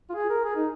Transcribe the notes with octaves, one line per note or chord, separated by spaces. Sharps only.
F4
G#4
A#4
G#4
D#4